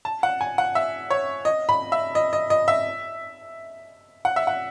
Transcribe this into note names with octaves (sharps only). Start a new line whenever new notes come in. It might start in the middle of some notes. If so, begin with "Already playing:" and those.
A5
F#5
G#5
F#5
E5
C#5
D#5
B5
E5
D#5
D#5
D#5
E5
F#5
E5
F#5